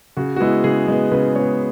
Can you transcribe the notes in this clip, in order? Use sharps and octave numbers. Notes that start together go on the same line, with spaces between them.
C#3 F#4
F#4
G#3 B3 E4
C#3 G#4
G#3 B3
C#3 B4
G#3 B3 C#5